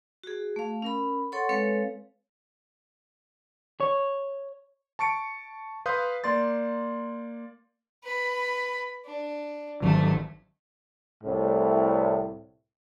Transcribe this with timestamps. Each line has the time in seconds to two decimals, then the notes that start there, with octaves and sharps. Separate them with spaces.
0.24 F#4 G#4
0.56 A3 F5
0.82 C#4 A#4 B5
1.32 A4 C#5 F#5 C6 C#6
1.49 G#3 C4 A4 B4 C#5 F5
3.80 C#5
4.99 A5 C#6 C#7 D7
5.86 B4 F5 C6 D#6 G6
6.24 A#3 D5 C6 A6
8.04 B4 B5
9.05 D4
9.82 G#1 D#3 F#3 A3
11.23 C2 A2